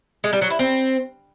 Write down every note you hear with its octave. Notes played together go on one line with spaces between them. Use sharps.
G#3
G3
F#3
E4
C4